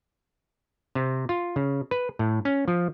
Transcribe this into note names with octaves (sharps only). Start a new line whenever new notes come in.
C3
F4
C#3
B4
A2
C#4
F3